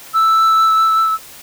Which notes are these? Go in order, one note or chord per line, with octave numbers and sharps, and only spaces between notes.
E6